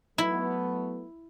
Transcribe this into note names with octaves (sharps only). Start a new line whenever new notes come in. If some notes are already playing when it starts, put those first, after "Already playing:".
F#3 A3 B3 E4